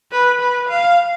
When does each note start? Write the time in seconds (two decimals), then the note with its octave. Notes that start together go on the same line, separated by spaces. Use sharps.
0.12 B4
0.40 B4
0.69 F5